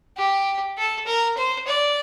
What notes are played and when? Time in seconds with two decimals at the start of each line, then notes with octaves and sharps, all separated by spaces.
0.17 G4
0.77 A4
1.06 A#4
1.37 C5
1.67 D5